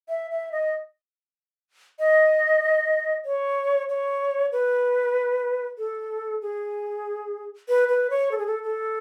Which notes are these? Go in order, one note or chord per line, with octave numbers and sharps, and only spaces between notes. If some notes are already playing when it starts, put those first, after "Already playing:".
E5
E5
D#5
D#5
C#5
C#5
B4
A4
G#4
B4
B4
C#5
A4
G#4
A4
A4